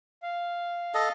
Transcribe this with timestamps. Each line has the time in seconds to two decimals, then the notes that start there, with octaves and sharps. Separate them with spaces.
0.22 F5
0.94 A4 D#5